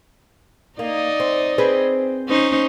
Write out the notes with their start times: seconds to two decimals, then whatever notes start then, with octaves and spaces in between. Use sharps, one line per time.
0.79 A#3 D#4 D5 D#5
1.20 C4
1.58 C4 G#4 B4
2.28 C#4 D#4 C5